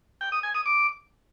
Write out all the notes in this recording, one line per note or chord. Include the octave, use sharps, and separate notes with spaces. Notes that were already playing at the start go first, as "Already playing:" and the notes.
G5
D#6
G#5
D#6
D6